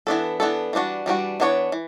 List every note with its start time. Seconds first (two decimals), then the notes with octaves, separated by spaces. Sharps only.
0.07 E3 B3 D4 A4
0.40 E3 B3 D4 A4
0.73 E3 G3 D4 F#4
1.06 E3 G3 D4 F#4
1.40 E3 B3 D4 F#4 C#5
1.72 E3